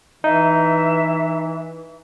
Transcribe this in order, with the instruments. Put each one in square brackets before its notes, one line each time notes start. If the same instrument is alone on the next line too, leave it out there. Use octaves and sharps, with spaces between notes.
[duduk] E3 [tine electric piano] D#4 [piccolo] E5